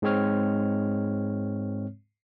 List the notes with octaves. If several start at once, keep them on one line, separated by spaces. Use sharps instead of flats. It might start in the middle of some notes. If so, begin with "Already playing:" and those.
G#2 G#3 C4 C#5 F6